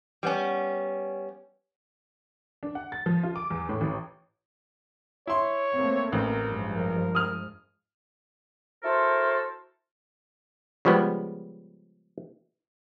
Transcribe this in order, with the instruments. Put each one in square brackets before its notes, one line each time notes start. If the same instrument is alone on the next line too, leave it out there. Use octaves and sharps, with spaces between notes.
[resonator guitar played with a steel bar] G3 B3 C#4
[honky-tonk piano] D4
F#5
A6
F3
F4
D6
E2
A2
A1
[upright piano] E4 C6 [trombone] C#5
[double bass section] A3 A#3 C4
[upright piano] A1 [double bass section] A#3 [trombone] A#4
[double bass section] G2 F3 G#3
[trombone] A#4
[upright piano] D#6 F6
[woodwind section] E4 F#4 A4 A#4 C5
[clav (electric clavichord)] C#3 F3 G3 G#3 B3